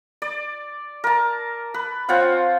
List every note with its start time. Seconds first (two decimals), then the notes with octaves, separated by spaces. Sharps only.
0.22 D5
1.04 A#4 A5
1.74 B4
2.08 C4 F4 C#5 F#5